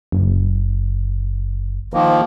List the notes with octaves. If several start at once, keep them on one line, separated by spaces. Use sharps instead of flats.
F#1
D#3 F3 A#3